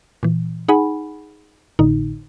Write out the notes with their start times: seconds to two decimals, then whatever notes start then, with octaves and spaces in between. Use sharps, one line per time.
0.23 A#2 E3
0.68 D#4 G#4 F#5 G#5 B5
1.79 G#1 A2 D3 D#4